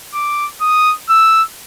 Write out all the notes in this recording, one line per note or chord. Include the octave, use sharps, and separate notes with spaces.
D6
D#6
E6